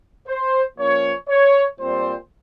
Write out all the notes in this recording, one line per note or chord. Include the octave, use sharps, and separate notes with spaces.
C5
F3 A#3 C#4 C#5
C#5
A#2 G3 C4 C5